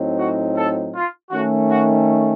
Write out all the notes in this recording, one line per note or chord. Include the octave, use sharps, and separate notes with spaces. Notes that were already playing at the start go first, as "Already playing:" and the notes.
Already playing: A2 F#3 C4 D#4
F#4
A4
F4
D#3 A3 C#4 F#4
F#4